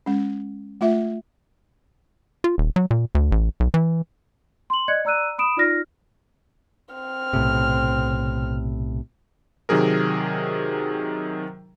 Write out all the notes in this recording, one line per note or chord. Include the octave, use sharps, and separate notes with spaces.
G#3 C#4
A3 F4 E5
F4
D#1
F#3
A#2
D2
A1
B1
E3
C6 F#7
D5 D#5 F#6 G#6 C#7
D5 A#5 E6 F#6 D#7
B5 D#6 D7 E7
D#4 F4 D5 F6 A#6
C4 F6
B1 A2 C3
C3 D#3 F#3 G#4 A#4